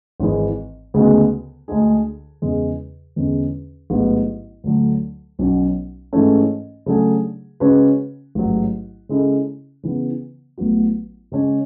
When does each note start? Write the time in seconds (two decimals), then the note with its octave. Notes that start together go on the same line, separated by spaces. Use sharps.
0.20 G#1 G#2 E3 G#3
0.94 D2 C#3 G#3 B3 F#4
1.68 D2 D3 G#3 D4 G#4
2.42 E2 C#3 G#3
3.16 E2 D3 G#3 C#4
3.90 A1 G#2 F#3 B3 F#4
4.64 D2 D3 F#3 A3
5.39 B1 B2 F#3 C#4
6.13 G#2 E3 A3 C#4
6.86 C#3 F#3 A3 D4 G#4
7.60 C#3 G#3 C#4 F#4 B4
8.35 A1 G#2 F#3
9.09 C#3 G#3 C#4 E4 A4
9.83 C#3 E3 B3
10.58 A1 A2 F#3 B3 F#4
11.32 C#3 G#3 C#4